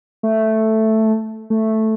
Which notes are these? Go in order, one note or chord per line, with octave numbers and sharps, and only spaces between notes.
A3
A3